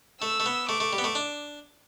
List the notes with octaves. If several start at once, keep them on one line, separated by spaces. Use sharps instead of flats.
A3 E6
A3
B3
A3 D6
A3
G3
B3
A3
D4